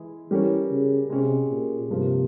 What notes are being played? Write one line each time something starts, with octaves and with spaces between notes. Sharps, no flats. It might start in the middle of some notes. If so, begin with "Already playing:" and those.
Already playing: E3 G#3 E4 G#4
E3 G3 C#4 G4 A#4 C#5
C#3
C3 G#3 C#4 G4
A#2
G2 C3 F3 A#3